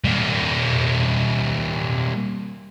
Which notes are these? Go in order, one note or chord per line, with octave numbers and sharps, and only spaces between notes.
G3 A#3